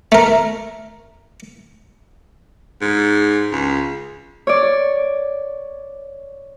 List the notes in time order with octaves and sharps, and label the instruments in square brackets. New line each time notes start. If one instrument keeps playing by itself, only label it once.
[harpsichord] A3 A#4
[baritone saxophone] G#2
C#2
[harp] C#5 D5